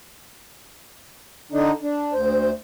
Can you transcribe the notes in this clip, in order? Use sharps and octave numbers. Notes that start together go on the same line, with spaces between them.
D3 D4 D#4
D4
D2 C5